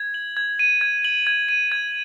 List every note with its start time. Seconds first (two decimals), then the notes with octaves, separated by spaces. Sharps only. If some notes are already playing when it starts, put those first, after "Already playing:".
Already playing: G#6
0.14 F#7
0.37 G#6
0.59 D#7
0.81 G#6
1.05 F#7
1.27 G#6
1.49 D#7
1.72 G#6